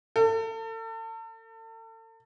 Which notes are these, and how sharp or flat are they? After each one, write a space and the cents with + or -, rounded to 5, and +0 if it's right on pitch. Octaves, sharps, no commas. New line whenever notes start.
A4 +35